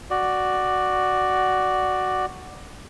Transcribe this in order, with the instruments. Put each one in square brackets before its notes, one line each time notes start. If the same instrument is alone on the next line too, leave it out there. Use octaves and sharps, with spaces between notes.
[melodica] F#4 D5